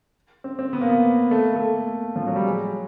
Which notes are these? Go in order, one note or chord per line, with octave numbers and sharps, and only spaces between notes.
C4
C4
B3
A#3
B3
A3
A#3
A3
F3
F#3
G3
G#3